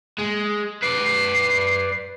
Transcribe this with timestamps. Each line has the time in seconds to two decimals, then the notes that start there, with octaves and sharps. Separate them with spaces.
0.18 G#3
0.82 B4 D5 C7